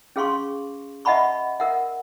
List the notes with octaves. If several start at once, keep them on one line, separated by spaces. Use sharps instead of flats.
C#4 G#4 F5 C6 C#6
D#5 E5 F#5 A5 B5 C#6
A#4 E5 F#5